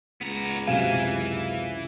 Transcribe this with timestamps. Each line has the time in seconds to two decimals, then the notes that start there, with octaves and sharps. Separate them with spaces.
0.21 C#2 B3 A#5
0.68 F#2 C3 E3 F5 G#5 E7